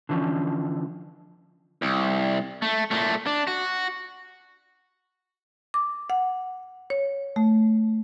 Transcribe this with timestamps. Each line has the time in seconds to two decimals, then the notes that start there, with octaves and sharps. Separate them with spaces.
0.09 D3 E3 F3 C#4
1.82 C2
2.62 A3
2.91 A#2 A3
3.26 D4
3.47 F#4
5.74 D6
6.10 F#5
6.90 C#5
7.36 A3